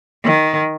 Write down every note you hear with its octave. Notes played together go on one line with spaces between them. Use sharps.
D#3